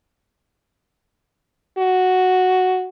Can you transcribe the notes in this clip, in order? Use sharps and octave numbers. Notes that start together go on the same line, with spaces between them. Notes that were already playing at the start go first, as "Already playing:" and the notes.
F#4